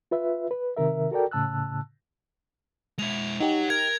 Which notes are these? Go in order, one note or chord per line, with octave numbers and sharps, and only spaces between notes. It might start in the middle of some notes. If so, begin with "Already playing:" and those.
F4 B4 E5
B4
C3 D#3 A#4 E5
F#4 A4 A#4 D5 G5
A2 C#3 A5 E6 F#6
G#3 E4 F7
D#4 G4 C#5 F#5
A#4 G#6